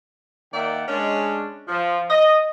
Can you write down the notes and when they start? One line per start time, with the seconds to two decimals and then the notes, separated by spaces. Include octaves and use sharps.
0.53 D#3 A#3 D5 E5 F#5 G5
0.88 G#3 C#4 D4
1.68 F3
2.10 D#5